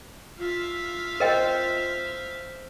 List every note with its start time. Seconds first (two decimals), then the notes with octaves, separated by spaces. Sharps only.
0.39 F4 E5 F5
1.20 A#4 C5 D#5 G5